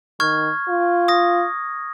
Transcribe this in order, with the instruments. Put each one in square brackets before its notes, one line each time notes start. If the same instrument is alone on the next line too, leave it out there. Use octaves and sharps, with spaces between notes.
[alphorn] D#3 [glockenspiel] C#6 F6 G#6
[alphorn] F4
[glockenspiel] D#6 A#6